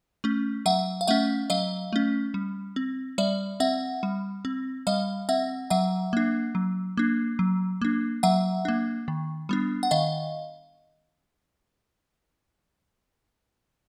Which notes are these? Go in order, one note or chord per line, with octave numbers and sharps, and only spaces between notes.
A3 C#4
F#3 E5 F#5
F5
A3 C#4 E5 F#5
F#3 D#5 F5
A3 C#4
G3
C4
G3 D5 E5
C4 E5 F#5
G3
C4
G3 D#5 F5
C4 E5 F#5
F#3 E5 F#5
A#3 D4
F#3
A#3 D4
F#3
A#3 D4
F#3 E5 F#5
A#3 D4
D#3
G3 B3 D4
F#5
D#3 D#5 F5